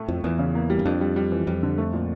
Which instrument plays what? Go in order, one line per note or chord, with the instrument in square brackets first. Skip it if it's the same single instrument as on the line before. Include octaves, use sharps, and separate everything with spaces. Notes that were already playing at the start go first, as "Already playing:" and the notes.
Already playing: [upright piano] A2 A3
[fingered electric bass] F2 [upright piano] F3
[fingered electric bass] E2 [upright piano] E3
[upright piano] C#3
A#3
G3
[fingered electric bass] G2
[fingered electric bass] F2 [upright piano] D4
[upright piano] G3
G3
E3
[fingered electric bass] F2 [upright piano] G3
[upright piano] D3
A3
A#2